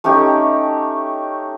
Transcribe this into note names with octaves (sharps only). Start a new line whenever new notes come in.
A3 C#4 D#4 G4